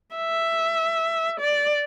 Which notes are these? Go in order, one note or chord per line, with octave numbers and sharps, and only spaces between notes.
E5
D5